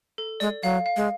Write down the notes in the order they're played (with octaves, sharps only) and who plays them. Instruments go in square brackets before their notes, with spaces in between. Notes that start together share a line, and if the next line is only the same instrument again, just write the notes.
[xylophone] A4
[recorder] G#3 [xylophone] D5
[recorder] F#3 [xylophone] F5
[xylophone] F5
[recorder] G#3